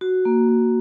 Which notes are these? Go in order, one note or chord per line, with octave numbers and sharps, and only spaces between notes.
F#4
A#3
A#3